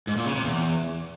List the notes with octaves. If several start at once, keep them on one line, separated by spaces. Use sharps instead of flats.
G#2
A#2
C#3
C3
E2